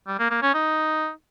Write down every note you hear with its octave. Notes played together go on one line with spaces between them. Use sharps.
G3
A#3
A#3
C#4
D#4